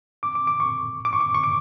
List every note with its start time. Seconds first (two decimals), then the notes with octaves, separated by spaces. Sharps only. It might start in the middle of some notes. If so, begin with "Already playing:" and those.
0.23 D6
0.35 D6
0.47 D6
0.60 C#6
1.05 D6
1.13 C#6
1.20 D6
1.35 C#6
1.44 D6